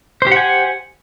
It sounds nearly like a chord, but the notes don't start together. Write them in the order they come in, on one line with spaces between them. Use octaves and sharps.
C5 G4 F#5 G#5